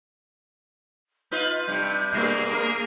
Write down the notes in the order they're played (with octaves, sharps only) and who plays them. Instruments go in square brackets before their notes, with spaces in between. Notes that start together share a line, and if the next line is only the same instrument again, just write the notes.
[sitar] D#4 F4 B4 [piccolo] G6
[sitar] G2 C3
[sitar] G2 B2 [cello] A#3 G#4
[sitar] A#4